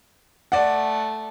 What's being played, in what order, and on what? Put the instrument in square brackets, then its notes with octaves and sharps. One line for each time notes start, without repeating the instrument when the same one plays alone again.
[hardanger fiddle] A3 [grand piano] D5 F#5